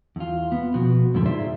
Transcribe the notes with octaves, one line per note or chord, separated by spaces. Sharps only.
E2 F4
B3
B2 F3 B3 F#4
F2 G#2 D3 A3
D#4 F4 G#4 C5 D5 E5